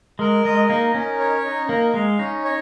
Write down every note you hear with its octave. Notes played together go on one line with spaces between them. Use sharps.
G#3 A#4
G#3 D#5
A#3 D#4
C#4 A#4
C#5
D#4
A#3 A#4
G#3 F5
C#4 D#4
C#5